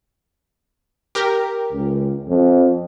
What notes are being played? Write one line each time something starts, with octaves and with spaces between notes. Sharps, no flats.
G4 A#4
C#2
F2